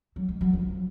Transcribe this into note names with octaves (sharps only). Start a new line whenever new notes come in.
F#3
G#3
F#3
F3